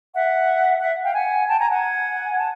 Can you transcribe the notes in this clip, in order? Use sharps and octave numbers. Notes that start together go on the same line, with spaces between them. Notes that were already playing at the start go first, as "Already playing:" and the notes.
E5 F#5
E5 F#5
F5 G5
F#5 G#5
G5 A5
G#5 A#5
F#5 G#5
A5